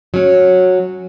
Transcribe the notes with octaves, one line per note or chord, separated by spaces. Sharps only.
F#3 C#4